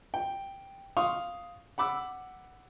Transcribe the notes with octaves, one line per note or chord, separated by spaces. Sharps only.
G5
F5 C6 C#6 D#6
F#5 B5 D6 E6